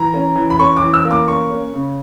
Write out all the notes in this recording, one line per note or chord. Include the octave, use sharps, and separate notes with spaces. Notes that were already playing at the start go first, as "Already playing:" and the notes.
Already playing: E3 A#5
C#4
E3
B5
C#4 C#6
D6
E3
E6
A#3
D6
C#4 C#6
C#4
C#3